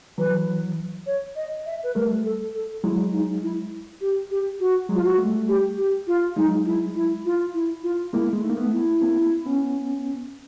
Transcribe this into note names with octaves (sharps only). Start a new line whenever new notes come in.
E3 F#3 B4
C#5
D#5
E5
B4
G3 A3 A#4
A4
A4
F#3 G#3 E4
D#4
E4
G4
G4
F#4
F#3 G#3
F4
F#4
G3 A3
G4
G4
F4
F#3 G#3 D#4
E4
E4
F4
E4
F4
G#3 A#3 E4
G#3
A3 D#4
A#3
A3 B3
E4
A#3 C4
B3 C#4